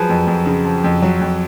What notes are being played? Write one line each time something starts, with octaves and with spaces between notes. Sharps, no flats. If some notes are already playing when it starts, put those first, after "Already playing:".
Already playing: F3 F#3 G#4 B4
F2
F2
C#3
F3
F2
F#3
F2